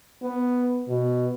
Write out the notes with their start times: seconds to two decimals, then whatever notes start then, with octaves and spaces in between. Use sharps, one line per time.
0.23 B3
0.88 B2